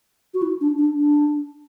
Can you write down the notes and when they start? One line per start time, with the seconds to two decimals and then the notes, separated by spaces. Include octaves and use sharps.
0.34 F#4
0.42 E4
0.61 D4
0.78 D4
0.97 D4